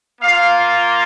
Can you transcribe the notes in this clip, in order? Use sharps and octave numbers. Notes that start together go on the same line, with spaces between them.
A#3 F4 F5